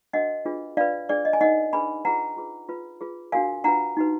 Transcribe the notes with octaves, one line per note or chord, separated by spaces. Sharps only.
D4 F#4 A#4 D#5 F#5
D4 F4 G#4 B4
D4 F4 B4 D5 F5
D4 G#4 B4 D5
D#5
G#5
D#4 A#4 D#5 F#5
D4 G#4 B4 G#5 B5
F4 G#4 B4 F#5 A#5
F4 G#4 B4
F4 B4
F4 G#4 B4
D4 F#4 A#4 F5 G#5
D4 F4 B4 F#5 A#5
D#4 F#4 B4